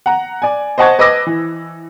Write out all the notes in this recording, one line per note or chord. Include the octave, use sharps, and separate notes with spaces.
F#5 A#5
D5 G#5
C5 D#5 F#5 A5 C#6 G#6
B4 D#5 B5 D6 E6 A#6
E3